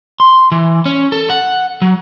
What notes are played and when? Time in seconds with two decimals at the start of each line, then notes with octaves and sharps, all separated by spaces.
0.20 C6
0.52 E3
0.86 C#4
1.12 A4
1.30 F#5
1.82 F#3